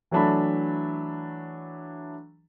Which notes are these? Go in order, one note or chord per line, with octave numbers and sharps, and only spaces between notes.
E3 F#3 A3 D4 A5 B5